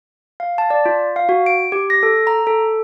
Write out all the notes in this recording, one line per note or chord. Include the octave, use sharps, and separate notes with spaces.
F5
A5
D5
F4
F5
F#4
D7
G4
A#6
A4
A#5
A4